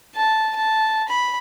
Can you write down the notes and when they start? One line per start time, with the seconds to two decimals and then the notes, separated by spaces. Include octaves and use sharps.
0.15 A5
0.56 A5
1.09 B5